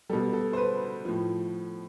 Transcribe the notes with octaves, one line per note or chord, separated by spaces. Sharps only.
B2 G3 A4
A4
C5
B4
A2 F3